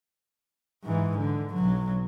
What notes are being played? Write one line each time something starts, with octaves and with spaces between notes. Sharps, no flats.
G#2 E3
D3
B1 F#3